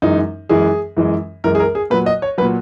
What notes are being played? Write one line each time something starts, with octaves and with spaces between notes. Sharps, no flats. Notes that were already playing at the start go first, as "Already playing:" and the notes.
F#2 E3 G#3 D#4
F#2 E3 G#3 G#4
F#2 E3 G#3
F#2 E3 G#3 A#4
G#4
A#4
G#4
A#2 F#3 B4
D#5
C#5
A#2 F#3 B4